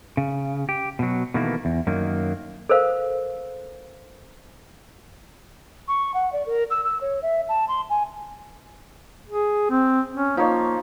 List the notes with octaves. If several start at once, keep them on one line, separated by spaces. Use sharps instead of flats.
C#3
G4
B2 F#3
B2 D#3 E3 A3 A#3
E2
F#2 D#3 F#3 A#3
A4 A#4 C5 F5
C#6
F#5
D5
A#4
E6
E6
C#5
E5
A5
C6
G#5
G#4
C4
C#4
F3 A#3 D#4 C#5